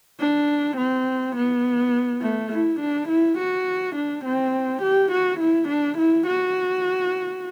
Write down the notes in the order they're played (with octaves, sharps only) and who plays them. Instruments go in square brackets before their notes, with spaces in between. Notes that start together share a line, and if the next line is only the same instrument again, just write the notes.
[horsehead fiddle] D4
C4
B3
A3
E4
D4
E4
F#4
D4
C4
G4
F#4
E4
D4
E4
F#4